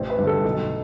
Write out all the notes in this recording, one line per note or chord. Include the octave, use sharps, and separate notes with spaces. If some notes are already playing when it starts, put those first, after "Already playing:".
Already playing: A1 C5
B4
G2 D3
A4
B1